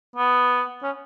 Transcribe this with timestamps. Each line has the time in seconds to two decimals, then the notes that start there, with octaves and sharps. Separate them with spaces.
0.16 B3
0.83 C#4